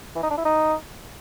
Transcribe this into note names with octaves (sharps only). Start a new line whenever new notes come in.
E3
D#4
D4
E4
D#4